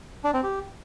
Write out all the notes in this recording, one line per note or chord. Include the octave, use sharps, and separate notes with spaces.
D4
C4
G4